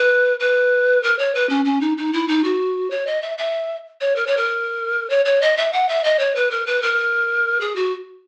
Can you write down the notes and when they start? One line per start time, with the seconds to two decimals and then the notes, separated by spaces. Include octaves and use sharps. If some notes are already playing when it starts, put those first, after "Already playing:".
Already playing: B4
0.39 B4
1.03 A#4
1.18 C#5
1.34 B4
1.49 C#4
1.65 C#4
1.81 D#4
1.97 D#4
2.13 E4
2.28 D#4
2.44 F#4
2.90 C#5
3.06 D#5
3.22 E5
3.38 E5
4.00 C#5
4.15 A#4
4.27 C#5
4.37 A#4
5.09 C#5
5.25 C#5
5.41 D#5
5.57 E5
5.73 F#5
5.88 E5
6.04 D#5
6.19 C#5
6.35 B4
6.51 A#4
6.66 B4
6.82 A#4
7.60 G#4
7.75 F#4